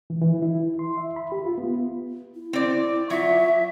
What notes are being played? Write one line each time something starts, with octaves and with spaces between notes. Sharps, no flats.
E3
E3
E4
C6
E5
B5
G4
F4
B3
E4
C4 D5
F#3 F4 E5